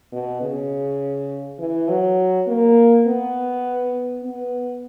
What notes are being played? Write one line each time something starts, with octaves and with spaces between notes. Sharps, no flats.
B2
C#3
E3
F#3
A#3
B3
B3